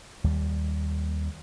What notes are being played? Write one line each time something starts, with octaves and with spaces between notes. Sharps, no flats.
D#2 G3